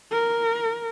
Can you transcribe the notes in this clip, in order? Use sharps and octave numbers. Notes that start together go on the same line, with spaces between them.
A#4